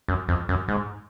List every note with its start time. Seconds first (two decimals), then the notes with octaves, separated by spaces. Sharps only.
0.08 F#2
0.28 F2
0.49 F#2
0.68 G#2